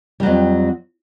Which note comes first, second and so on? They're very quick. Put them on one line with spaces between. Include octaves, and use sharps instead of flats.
G3 F#3 F2